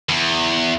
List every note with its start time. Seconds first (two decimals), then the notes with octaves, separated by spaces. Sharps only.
0.09 E2